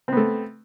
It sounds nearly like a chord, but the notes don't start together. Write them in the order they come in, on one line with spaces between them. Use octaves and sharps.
C4 B3 A3